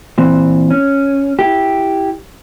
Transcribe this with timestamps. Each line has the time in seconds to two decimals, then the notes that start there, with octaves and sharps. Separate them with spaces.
0.18 A#2 E3 C4
0.71 C#4
1.39 E4 G4